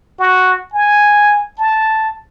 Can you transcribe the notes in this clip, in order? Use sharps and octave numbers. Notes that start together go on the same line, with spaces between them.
F#4
G#5
A5